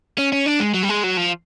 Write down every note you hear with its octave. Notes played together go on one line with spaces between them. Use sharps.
C#4
C#4
D4
G#3
F#3
G3
G#3
F#3
F3